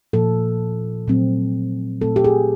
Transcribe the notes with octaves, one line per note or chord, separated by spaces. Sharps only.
A#2 F3 A#3 A4
A#2 F#3 A3 C4
A#2 F#3 A3 C4 A4
G4
G#4